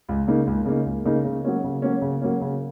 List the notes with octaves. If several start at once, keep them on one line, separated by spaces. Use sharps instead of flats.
C#2
C#3 A#3 D#4
C#2
C#3 A#3 D#4
C#2
C#3 A#3 D#4
C#3
F#3 A#3 C#4
C#3
F#3 A#3 C#4
C#3
F#3 A#3 C#4
C#3